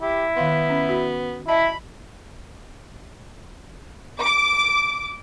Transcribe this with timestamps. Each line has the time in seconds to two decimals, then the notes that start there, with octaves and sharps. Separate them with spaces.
0.01 E4 G4
0.36 D#3 B3 F5 C6
0.70 C#4
0.89 F#4
1.48 E4 D#5 E5 A5 B5
4.22 D6